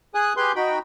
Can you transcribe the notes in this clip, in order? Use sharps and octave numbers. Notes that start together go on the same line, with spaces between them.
G#4 G#5 D#6 F#6
G4 G#4 B4 C6 G6
D#4 F#4 G5 B5